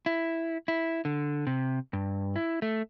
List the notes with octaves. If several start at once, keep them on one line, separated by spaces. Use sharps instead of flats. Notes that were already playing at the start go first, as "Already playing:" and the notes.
E4
E4
D3
C3
G2
E4
A3